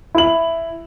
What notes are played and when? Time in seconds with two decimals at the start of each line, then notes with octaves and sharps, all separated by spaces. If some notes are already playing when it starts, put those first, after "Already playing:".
0.15 E4 F#7